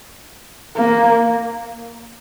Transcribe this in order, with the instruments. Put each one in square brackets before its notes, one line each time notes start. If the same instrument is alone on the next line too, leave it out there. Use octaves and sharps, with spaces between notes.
[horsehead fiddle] A#3